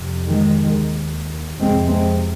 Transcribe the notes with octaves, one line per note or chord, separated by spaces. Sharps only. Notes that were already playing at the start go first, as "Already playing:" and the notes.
Already playing: F2 C3
D#3 G#3
D#2
F2 C3 G#3 C4
G#3 C4